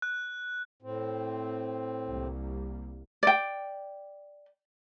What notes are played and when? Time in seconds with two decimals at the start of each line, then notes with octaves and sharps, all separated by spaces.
0.02 F#6
0.83 A2 C4
2.07 C2 G3 A#3
3.23 D5 G5